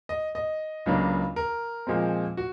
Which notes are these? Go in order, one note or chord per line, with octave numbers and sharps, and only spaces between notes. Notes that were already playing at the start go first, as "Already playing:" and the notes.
D#5
D#5
C#2 C#3 F#3 A#3 D4
A#4
A#2 F3 G#3 C4
F#4